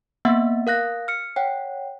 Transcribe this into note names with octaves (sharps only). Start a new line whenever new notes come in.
A#3 B3 E5 F#5
A#4 F5 F#6 A#6
F6 C#7
C#5 F#5 G5